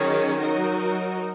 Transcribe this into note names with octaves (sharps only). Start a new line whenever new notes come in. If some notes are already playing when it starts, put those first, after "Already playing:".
Already playing: D#3 F#3 C#4 G#4 C#5
F#3 D#4 F#4 A#4